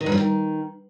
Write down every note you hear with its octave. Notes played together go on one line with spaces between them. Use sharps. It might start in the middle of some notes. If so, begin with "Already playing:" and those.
D#3
G2
F3
D#3